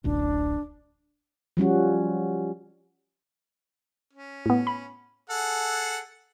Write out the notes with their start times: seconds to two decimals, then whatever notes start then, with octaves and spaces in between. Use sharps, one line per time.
0.04 D1 A1 D2 D4
1.57 F3 G3 C#4 F#4
4.13 C#4
4.46 A2 B3
4.67 B5
5.30 G#4 A4 F#5